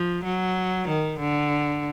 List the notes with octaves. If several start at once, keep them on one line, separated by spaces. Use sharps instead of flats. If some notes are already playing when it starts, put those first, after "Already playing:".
Already playing: F3
F#3
D#3
D3